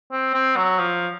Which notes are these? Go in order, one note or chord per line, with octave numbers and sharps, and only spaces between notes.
C4
C4
F#3
F3